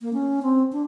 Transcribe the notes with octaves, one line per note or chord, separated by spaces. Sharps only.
A#3
C#4
C4
D4